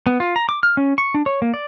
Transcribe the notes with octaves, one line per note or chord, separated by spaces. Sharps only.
B3
F4
A#5
D6
F6
C#4
C#6
D4
C#5
A#3
D5